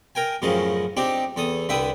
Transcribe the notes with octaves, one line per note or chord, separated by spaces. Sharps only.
A#4 G5 G#5
F#2 A2 C#3 F3 D#5
C4 D4 D#4 G4
E2 A4 D#6
C2 D3 B4 E5 G5 D#6